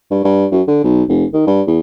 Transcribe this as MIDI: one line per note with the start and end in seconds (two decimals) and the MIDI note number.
0.11 0.23 43
0.24 0.46 43
0.52 0.62 42
0.68 0.79 50
0.84 1.03 35
1.09 1.25 29
1.33 1.43 51
1.47 1.62 43
1.67 1.80 40